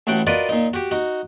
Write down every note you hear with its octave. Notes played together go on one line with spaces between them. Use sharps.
A1 A2 F#4 F#5 G5
F4 F#4 A#4 B4 D5 D#5
A#2 D#4
F#4 G4
D#4 F#4